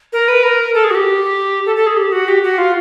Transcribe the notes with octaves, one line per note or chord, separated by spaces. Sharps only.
A#4
B4
A#4
A4
G#4
F#4
G4
A4
A4
G#4
G4
F#4
G4
F#4
F4